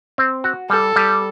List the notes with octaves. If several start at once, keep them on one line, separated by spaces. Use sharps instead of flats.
C4
F#4
G3 A4
G3